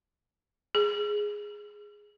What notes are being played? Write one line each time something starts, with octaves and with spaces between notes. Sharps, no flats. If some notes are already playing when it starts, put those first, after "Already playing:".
G#4